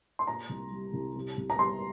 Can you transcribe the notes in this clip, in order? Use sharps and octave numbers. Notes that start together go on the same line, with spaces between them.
C6
A#2 A#5
C2
G3
C2
C3
C2
A#5
G3 C6